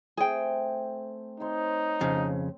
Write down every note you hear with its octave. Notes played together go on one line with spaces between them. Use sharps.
A3 C4 G#4 G5
C4 D#4 C#5 C6
F2 C#3